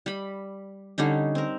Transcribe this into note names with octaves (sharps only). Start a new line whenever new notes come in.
G3 B5
D3 G3 C#4 D#4
C4 A#4